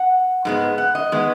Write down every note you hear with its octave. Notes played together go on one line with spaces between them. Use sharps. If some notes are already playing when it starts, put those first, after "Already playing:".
Already playing: F#5
G#2 G#3 B3
F#5
D#5
D#3 G#3 B3